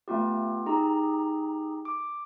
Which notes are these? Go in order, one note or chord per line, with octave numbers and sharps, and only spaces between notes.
A3 B3 F4 G4
D#4 G4 G#4 A#5
D6